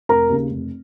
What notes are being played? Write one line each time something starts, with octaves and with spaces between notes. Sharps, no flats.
F1 A#4 A#5
D#2 C#3
F1